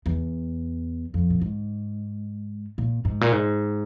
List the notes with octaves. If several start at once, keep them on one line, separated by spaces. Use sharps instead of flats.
E2
F2
A#2
G#2
A#2
G#2
A#2
G#2